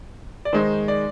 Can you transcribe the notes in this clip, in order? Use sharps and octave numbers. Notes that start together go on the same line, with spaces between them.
D5
D#3 G#3 D#4 C5
D5